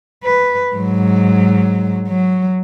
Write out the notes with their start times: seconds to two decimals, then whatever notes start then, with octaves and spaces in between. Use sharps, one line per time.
0.24 B4
0.75 G#2 F#3
2.08 F#3